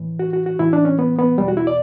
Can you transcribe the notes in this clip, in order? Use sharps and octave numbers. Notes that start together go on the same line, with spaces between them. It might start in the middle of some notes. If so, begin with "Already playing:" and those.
Already playing: A2 E3
F#4
F#4
F#4
A2 E3 E4
D4
C#4
B3
B3
E2 B2 G3
F#4
E4
D5